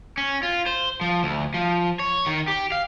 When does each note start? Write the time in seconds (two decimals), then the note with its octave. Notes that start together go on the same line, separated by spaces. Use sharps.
0.18 C#4
0.43 F4
0.66 C5
1.01 F3
1.23 D2
1.54 F3
1.99 C#5
2.26 D#3
2.48 G4
2.72 F5